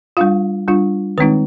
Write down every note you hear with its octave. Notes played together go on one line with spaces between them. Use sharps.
G3 D4 F4 F5
G3 D4 F4
D#3 G#3 C4 D#4 B4